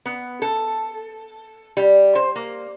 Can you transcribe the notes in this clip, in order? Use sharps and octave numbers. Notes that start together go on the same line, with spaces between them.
B3
A4
G3
C5
A#3